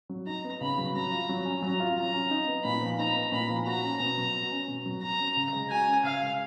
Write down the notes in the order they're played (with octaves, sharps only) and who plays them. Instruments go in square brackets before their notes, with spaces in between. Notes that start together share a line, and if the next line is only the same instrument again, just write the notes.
[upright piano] F#3
[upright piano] D#4 [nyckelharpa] A#5
[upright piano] B3
[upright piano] C#3 [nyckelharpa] B5
[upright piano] F#3
[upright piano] F#3 [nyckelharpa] A#5
[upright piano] F4
F#3
C#4
[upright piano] F#3 [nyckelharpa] A#5
[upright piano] F4
[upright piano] F#3 [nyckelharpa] A#5
[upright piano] C#4
D#4
B3
[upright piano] A#2 [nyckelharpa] B5
[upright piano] F3
[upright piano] D#4 [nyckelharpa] A#5
[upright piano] B3
[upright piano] A#2 [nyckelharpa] B5
[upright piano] F3
[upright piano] F#4 [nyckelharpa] A#5
[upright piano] C#4
B2
F#3
F#4
C#4
B2
F#3
[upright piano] F#4 [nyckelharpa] A#5
[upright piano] C#4
C#3
G#3
[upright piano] F#4 [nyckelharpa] G#5
[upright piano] C#4
[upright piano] C#3 [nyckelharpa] F5
[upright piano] G#3